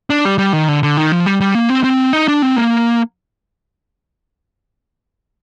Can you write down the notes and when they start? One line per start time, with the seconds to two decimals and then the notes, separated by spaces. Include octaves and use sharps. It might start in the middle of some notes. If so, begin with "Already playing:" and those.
0.10 D4
0.25 G3
0.39 G3
0.53 D#3
0.69 D3
0.83 D3
0.97 D#3
1.12 F3
1.26 G3
1.41 G3
1.55 A#3
1.70 C4
1.84 C4
2.13 D#4
2.28 D4
2.42 C4
2.56 A#3